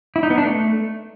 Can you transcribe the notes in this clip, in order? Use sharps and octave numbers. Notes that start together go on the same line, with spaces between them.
E4
D#4
B3
D4
A3